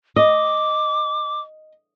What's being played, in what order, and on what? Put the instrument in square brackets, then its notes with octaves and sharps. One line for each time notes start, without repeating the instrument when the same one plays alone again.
[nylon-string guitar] D#5 [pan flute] D6